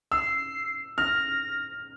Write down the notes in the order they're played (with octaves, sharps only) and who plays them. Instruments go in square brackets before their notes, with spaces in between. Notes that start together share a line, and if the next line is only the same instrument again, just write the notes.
[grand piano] E6 [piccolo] C7
[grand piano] F6 [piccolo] A#6